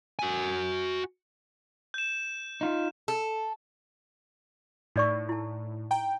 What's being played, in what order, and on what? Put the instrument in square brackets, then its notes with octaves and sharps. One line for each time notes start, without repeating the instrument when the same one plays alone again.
[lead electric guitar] F#4 G#5
[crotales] G6 E7
[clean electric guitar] D#4 F4
[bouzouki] A4
[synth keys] A2 [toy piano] D#4 D5 C#6
[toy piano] E4 A5
[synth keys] G5 [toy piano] A#5